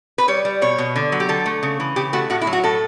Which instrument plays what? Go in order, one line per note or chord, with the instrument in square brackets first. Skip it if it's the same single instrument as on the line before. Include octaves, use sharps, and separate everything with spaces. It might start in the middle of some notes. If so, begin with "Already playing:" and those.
[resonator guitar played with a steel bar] B4
G3 C#5
G3
B2 C#5
B2
D3
F#3
G4
D3 A4
A3
C#3
E3
C#3 G4
A3 F#4
A2 F#4
E4
F#3
F#4
A2 A4